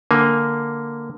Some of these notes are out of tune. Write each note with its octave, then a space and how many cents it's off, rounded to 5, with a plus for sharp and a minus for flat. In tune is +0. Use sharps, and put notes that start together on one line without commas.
D3 +0 A#3 +0 G#5 +0